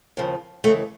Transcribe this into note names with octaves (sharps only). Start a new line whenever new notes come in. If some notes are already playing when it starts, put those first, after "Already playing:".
D#2 C#3 F3
D#2 C#3 E3 A3